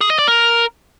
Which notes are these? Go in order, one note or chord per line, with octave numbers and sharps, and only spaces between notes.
G#4
D#5
D5
A#4